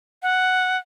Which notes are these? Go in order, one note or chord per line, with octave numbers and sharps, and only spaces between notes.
F#5